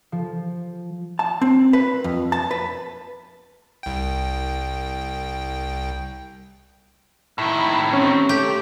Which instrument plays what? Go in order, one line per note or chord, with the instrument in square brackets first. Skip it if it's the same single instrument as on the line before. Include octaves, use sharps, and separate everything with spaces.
[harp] F3
[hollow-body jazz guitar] A5
C4
B4
F2
A5
B4
[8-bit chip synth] C2 G5
[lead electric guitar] A2 D#3 [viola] E4
[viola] C4 G4 [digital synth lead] C#4
[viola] A3 [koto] G4